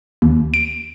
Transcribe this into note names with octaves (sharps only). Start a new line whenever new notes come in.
D#2
D7